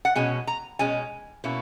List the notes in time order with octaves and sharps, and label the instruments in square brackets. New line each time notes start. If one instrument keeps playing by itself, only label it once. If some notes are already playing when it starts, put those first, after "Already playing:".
[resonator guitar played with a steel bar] F#5
B2 G#3 C#4 G#5
A#5
B2 G#3 C#4 G#5
B2 A#3 C#4 E4